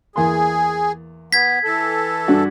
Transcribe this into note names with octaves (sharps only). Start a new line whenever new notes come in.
E2 A#3 G#4 C6
B3 G#6 B6
E3 A4
G2 D4 F#4